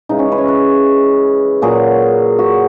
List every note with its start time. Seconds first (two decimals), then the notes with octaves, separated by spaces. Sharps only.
0.09 C#3 E3 G#3 D#4
0.19 C#4
0.32 B4
0.38 C#5
0.48 B4
1.62 A#2 F#3 G#4
2.39 F#4